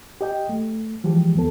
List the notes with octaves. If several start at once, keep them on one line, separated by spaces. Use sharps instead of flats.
G4 D#5 G5
A3
E3 F3 G#3 G4
D#2 B3 A4